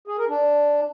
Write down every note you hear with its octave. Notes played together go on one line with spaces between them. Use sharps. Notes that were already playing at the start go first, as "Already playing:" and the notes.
G#4
A#4
D4